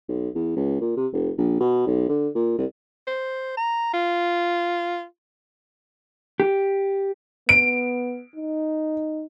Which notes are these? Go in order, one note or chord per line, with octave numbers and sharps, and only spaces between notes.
B1
E2
C#2
A#2
C3
F1
A#1
B2
B1
D3
A#2
C2
C5
A#5
F4
G4
B3 D7
D#4